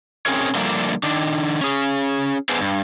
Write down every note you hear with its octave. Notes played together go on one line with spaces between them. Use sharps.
C4 C#4 G#4 A#4 C#5
D3 F3 G3 A3 A#3 D4
D#3 D4
C#4 G#4
B3 D4 G#4 B4 C5
G2